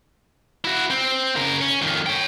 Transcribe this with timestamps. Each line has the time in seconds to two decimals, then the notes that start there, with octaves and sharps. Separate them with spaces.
0.64 E4 F#4
0.90 C4
1.36 C#3 A#4
1.61 C#4
1.82 F2 D#3
2.06 C#5 G5